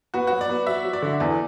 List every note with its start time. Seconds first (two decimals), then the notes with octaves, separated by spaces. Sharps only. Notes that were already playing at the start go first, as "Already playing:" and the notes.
0.14 B3 F#4
0.27 F#3 F#4
0.41 D5
0.49 B3
0.67 F#3 E5
0.84 F#3
0.93 D5
1.02 D3
1.20 E2 D5